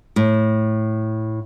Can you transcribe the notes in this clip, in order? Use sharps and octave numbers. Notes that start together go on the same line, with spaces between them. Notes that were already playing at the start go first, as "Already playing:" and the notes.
A2